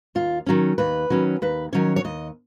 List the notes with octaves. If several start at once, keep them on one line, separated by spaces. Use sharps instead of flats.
D#2 F4
D#3 F#3 C#4
D#2 B4
D#3 F#3 C#4
D#2 B4
D#3 F#3 C#4 C#5
C#5
D#2 D#5